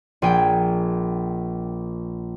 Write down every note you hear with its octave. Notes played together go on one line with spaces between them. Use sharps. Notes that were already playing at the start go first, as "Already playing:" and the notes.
A#1 G#4 G5